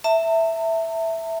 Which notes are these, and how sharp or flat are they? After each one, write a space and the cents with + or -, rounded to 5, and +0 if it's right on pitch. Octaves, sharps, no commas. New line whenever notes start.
E5 +0 A5 +45